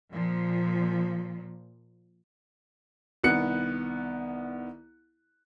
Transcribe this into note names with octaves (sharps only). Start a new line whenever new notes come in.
A#2 F3
C2 D#3 B3 F#6 C#7